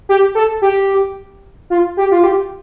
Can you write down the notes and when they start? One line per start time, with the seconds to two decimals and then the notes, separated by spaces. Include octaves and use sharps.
0.09 G4
0.35 A4
0.62 G4
1.70 F4
1.97 G4
2.11 F4
2.23 G4